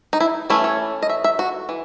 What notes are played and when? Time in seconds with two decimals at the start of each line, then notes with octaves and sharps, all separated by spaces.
0.13 D#4
0.20 E4
0.50 E3 A3 C#4 E4
0.64 C#5
1.03 D#5
1.10 E5
1.24 E5
1.39 F#4
1.69 E3